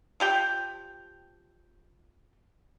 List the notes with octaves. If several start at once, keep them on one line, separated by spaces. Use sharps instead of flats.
F3 G4 G5